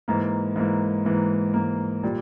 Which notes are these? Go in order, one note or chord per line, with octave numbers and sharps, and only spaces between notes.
G#2 E3 A#3
G#2 E3 A#3
G#2 E3 A#3
G#2 E3 A#3
A#2 G3